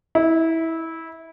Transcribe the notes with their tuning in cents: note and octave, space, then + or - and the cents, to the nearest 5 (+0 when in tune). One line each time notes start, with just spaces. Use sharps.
E4 -20